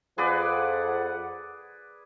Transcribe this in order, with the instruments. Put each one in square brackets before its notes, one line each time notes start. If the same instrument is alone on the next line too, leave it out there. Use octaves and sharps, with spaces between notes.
[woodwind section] F2 F3 F#5 [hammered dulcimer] G#4 B4 D5